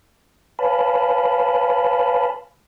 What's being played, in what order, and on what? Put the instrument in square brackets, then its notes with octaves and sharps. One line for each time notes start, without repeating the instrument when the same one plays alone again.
[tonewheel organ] B4 C#5 F5 G#5 A5 B5